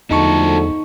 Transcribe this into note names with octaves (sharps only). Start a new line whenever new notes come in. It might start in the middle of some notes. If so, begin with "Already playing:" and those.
E2 D3 F3 A3 D#4 F#4 A4 C#6